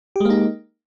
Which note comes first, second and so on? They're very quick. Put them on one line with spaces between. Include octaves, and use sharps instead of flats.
G4 G#3 A#3 D#4